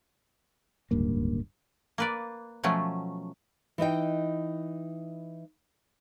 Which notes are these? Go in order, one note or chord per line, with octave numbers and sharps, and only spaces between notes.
D1 C#2 G2 A#3
A#3 B4 D5
B2 F3 F#3 A3 C#4
E3 D#4 D#5 G5